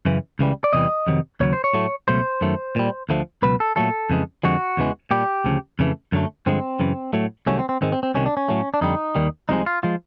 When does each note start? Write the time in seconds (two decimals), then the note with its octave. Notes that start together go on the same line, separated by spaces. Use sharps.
0.05 F#2 C#3 E3
0.39 C#2 C#3 E3 G3
0.64 D5
0.73 E2 C3 E3 G3 D#5
1.07 F2 C3 D#3 F#3
1.40 D#2 C#3 F#3 C#5
1.53 C5
1.64 C#5
1.74 A2 F#3 A3
2.08 C#2 B2 F#3 A3 C5
2.41 F#2 D#3 F#3 A3
2.76 A#2 G3
3.09 D2 D3 F3 A3
3.42 C#2 B2 F#3 B4
3.60 A4
3.76 A#2 F#3 A3 A4
4.10 F2 C#3 E3 G#3
4.43 F2 D3 F3 G#3 F#4
4.77 E2 C#3 E3 G#3
5.11 A#2 G3 G4
5.44 D2 C#3 F3
5.79 F2 C#3 E3 A3
6.12 F#2 D3 F#3 A3
6.46 G2 D3 F3 G#3 C4
6.80 F#2 C#3 E3
7.13 A2 F#3 A3
7.46 C2 C3 D#3 F#3 A3 C#4
7.59 C4
7.69 C4
7.81 G#2 D#3 G#3 C4
7.92 C4
8.03 C4
8.14 C2 C3 D#3 C#4
8.26 D4
8.37 C#4
8.48 A2 F#3 A3
8.74 D4
8.81 F2 D3 G3 D#4
9.15 D#2 D#3 G3
9.49 C2 C3 F3 G#3 D#4
9.66 F4
9.83 F3 G#3 F4